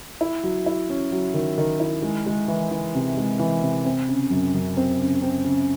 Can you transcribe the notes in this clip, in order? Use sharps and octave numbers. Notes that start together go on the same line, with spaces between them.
E4
F#3
E4
C#4
F#3
D#3
D#3
E4
G#3
G#3
E3
E3
C3
G#3
E3
C3
C4
C#3
F#2
F#2
C4
C#3
C4
C#3